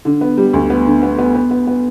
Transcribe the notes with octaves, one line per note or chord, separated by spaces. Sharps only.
D3
B3
G3
D2
B3
D3
B3
B3
B3
B3
B3